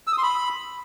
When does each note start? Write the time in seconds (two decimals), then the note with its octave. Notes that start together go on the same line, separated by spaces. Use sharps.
0.07 E6
0.13 D#6
0.18 C6
0.23 B5